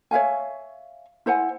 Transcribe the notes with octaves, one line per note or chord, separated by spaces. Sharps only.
C#5 E5 F5 G#5
E4 C5 F#5 G#5